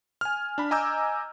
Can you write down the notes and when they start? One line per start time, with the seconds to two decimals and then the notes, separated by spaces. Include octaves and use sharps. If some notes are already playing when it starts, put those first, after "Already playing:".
0.21 G#5 F6
0.58 D4 B5
0.71 D#5 G#5 A#5 D6 E6 G6